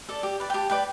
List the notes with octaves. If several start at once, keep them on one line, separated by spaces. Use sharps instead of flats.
A4 D5
G4
B4 D5
G5
G4 A5
B4 D5 G5